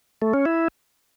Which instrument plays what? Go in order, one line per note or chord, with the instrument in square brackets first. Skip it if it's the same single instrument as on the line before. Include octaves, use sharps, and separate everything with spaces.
[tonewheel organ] A3
C#4
E4